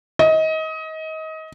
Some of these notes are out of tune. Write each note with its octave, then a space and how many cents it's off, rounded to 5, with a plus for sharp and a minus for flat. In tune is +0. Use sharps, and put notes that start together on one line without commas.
D#5 +25